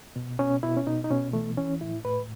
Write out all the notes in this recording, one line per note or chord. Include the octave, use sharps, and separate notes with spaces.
B2
B2 C#4
B2 E4
C#4
B2 D#4
D#4
B2 C#4
E3 A3
E3 C#4
A2 E4
A2 B4